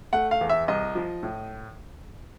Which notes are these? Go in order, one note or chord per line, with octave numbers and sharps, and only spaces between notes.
A3 F#5
F5
E2
E5
C2 D#5
F3
A2